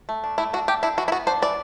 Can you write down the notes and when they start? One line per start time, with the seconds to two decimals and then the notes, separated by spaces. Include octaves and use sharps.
0.09 A3
0.24 D4
0.38 A3 E4
0.53 D4 F#4
0.68 A3 G4
0.83 D4 E4
0.98 E3 F#4
1.08 E4
1.12 B3 F#4
1.27 D4 C5
1.42 E3 D5